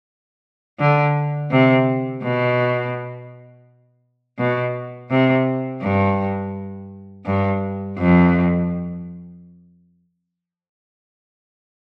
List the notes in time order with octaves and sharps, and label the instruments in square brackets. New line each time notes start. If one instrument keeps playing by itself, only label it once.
[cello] D3
C3
B2
B2
C3
G2
G2
F2